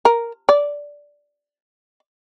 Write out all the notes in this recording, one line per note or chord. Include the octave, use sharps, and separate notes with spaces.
A#4
D5